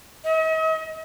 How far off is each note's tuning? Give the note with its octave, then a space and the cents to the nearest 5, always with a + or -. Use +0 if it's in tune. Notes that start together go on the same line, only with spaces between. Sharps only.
D#5 +45